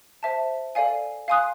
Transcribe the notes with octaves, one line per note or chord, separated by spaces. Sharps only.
C5 E5 A5
A4 D5 F5 G#5
F5 G#5 C6 D#6 F#6